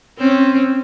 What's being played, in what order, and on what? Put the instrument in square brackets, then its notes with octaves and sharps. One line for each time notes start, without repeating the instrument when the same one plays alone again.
[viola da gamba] C4 C#4